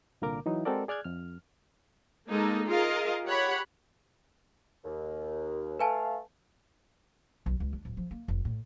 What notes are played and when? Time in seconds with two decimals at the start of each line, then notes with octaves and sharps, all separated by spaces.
0.22 C2 A#2 D3 A#3 A#4 D6
0.46 E3 F#3 D#4 E4
0.65 G#3 C4 F#4 A4 A#4 D5
0.88 G#4 D5 F6 F#6 G#6
1.04 F2 F6
2.29 G#3 A#3 D#4 A4
2.67 F4 G#4 A#4 D#5 F5
3.25 G4 C#5 F#5 B5
4.84 D#2
5.79 A3 B4 F5 G#5 A5
7.46 B1
7.60 C#2
7.73 D4
7.85 D1
7.97 F3
8.11 A#3
8.28 F1
8.45 A2